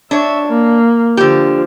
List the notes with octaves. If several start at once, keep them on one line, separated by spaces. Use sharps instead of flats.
D4 C#5 E5
A#3
D3 F3 G4